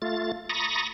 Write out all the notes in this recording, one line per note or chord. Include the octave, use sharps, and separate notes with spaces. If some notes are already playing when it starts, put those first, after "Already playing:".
A3 F4 A6
A#5 B5 C#6 D#6 A6 A#6